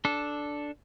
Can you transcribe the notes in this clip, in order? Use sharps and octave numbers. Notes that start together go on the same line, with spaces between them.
D4 A4